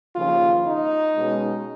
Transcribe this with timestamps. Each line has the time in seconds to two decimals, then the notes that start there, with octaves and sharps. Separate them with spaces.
0.15 D#2 C#3 F3 A#3 C#4 F4
0.65 D#4
1.16 B2 G#3 C#4